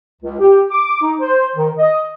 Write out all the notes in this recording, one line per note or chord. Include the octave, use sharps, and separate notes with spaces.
C#2
G4
D6
D#4
C5
D#3
D#5